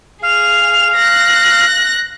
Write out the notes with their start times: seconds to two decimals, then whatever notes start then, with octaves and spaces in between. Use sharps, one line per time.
0.23 G#4 F5 F7
0.95 F#6 A#6